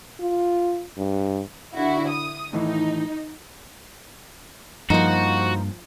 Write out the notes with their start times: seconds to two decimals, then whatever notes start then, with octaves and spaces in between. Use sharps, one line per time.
0.21 F4
0.98 G2
1.76 D3 E4 F#4
2.09 D#6
2.53 A2 D#3 E3 D#4
4.90 G2 F3 A#3 D#4 F#4 C5